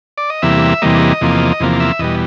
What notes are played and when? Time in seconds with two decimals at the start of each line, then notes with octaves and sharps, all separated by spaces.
0.18 D5
0.30 D#5
0.42 E2 C3 E3 G3 A#3 E5
0.82 E2 C3 E3 G3 A#3 D#5
1.21 E2 C3 F3 A#3
1.60 E2 C3 F3 A#3
1.80 E5
1.99 E2 B2 G3 D#5